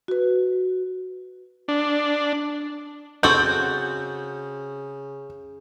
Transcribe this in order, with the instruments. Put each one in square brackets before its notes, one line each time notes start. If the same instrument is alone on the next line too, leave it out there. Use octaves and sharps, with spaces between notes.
[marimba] F#4 B4
[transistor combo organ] D4
[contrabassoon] C#3 [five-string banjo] C4 F#4 A4 [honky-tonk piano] G6